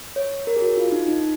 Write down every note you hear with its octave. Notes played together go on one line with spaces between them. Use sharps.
C#5
A#4
G#4
F#4
F4
D#4
D#4